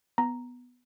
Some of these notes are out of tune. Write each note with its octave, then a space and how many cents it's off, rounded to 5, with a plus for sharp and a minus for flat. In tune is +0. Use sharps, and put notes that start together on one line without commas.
B3 +0 A#5 +0